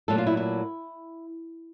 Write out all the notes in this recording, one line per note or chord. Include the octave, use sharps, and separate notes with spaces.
A#2 F#3 A3 A4
F4
E4
E4